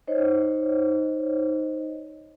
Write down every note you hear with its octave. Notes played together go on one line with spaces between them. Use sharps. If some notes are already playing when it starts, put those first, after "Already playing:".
D#4 C5 C#5 D#5